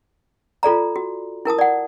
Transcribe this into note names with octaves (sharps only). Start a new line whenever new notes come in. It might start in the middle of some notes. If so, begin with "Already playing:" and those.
F4 A4 D5 A#5
F#4
E4 A#4 A5 D#6
D5 F#5